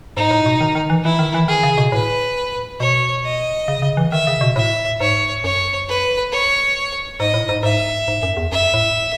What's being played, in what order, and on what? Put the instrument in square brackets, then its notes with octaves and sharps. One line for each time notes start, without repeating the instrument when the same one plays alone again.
[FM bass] G#2 [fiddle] D#4
[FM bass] A2
B2
D#3
D#3
E3
[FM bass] E3 [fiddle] E4
[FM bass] D#3
E3
[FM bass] D#3 [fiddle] G#4
[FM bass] C#3
B2
[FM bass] A2 [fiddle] B4
[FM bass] B2 [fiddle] C#5
[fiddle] D#5
[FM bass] C#3
C#3
E3
[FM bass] D#3 [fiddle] E5
[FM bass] C#3
B2
[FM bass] A2 [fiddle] E5
[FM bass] G#2 [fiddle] C#5
[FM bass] F#2 [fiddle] C#5
[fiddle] B4
C#5
[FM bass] G#2 [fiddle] D#5
[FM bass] A2
G#2
[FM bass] G#2 [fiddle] E5
[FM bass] G#2
F#2
E2
[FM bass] F#2 [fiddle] E5
[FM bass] A2